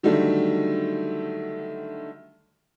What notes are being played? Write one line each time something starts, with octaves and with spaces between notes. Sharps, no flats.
D3 D#3 F#3 G3 A3